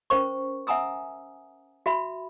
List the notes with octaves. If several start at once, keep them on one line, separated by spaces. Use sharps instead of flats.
C#4 A#4 C5 C#6
E5 F#5 G#5 A#5 D#6 E6
F#4 E5 B5